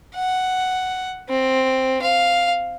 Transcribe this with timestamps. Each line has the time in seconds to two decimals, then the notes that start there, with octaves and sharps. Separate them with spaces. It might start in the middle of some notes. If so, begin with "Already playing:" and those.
0.15 F#5
1.29 C4
2.02 F5